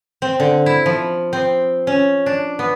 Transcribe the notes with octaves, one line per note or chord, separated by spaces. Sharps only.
C4
D3
E4
F3
C4
C#4
D4
B3